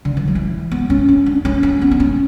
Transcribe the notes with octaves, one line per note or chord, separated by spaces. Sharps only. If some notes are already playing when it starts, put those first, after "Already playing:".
D3
E3
F#3
E3
B3
C#4
C#4
D4
C#4
C#4
B3
D4
C#4